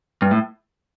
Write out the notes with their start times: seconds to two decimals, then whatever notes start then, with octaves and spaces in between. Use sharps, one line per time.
0.22 G2
0.31 A2